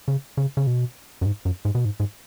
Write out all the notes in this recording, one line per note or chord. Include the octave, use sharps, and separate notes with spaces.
C#3
C#3
C#3
B2
F#2
G#2
F#2
G#2
B2
G#2
G#2